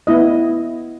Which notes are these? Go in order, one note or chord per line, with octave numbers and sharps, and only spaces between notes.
B3 E4 D#5